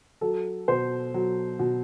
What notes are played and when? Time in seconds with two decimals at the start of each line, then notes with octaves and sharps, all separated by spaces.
0.21 F#3 A4
0.68 B2 C5
1.14 F#3
1.59 B2